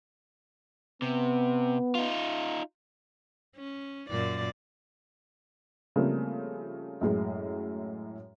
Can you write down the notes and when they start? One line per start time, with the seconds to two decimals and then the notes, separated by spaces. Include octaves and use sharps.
1.02 C3 B3
1.95 D#4 F4
3.56 C#4
4.10 F#2 A#2 D5
5.96 C#3 F3 G3 A3 A#3 C4
7.01 F#2 A2 G#3